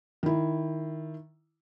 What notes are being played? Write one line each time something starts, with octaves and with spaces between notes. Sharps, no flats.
D#3 E4